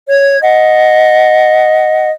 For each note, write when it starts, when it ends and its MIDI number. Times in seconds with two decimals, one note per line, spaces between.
0.09 0.40 73
0.09 0.40 92
0.41 2.10 75
0.41 2.10 78